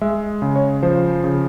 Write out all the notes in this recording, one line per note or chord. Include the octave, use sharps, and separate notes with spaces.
G#3 E5
C#3
C#5
F3 C5
C#3